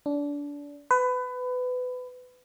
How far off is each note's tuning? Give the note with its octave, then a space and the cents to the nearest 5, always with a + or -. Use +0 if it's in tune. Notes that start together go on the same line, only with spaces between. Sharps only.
D4 -25
B4 +25